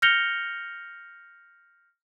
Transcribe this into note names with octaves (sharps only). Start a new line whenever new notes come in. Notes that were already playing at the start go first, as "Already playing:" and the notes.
F6 G6 A#6 C#7 F7 G7